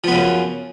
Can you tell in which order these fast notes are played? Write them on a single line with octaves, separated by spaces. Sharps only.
F3 B3 C#3 F#2